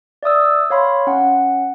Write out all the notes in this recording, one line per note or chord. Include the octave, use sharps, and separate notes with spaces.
D5 E5 D#6 E6
C#5 F5 B5 C6
C#4 F#5